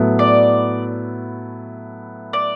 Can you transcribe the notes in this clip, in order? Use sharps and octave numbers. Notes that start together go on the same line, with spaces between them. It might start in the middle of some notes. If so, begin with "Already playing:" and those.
Already playing: A2 F#3 B3 E4 A4
D5
D5